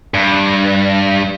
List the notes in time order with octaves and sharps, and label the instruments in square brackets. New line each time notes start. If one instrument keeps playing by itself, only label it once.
[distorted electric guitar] G2